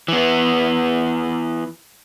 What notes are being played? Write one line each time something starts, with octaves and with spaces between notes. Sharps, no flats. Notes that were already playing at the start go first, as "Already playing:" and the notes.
E3 B3